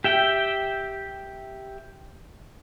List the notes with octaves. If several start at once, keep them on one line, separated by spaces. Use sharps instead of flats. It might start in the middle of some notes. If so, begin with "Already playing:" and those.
G4 E5 G5